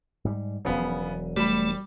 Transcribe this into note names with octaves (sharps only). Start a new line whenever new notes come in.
G#2 G3
E1 C#3 F3 F#3 B3
G3 A3 B5